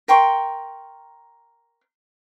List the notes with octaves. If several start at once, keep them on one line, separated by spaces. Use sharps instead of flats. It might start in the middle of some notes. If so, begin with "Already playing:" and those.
A#4 G5 C6 C#6